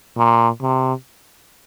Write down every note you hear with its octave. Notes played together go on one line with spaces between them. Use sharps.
A#2
C3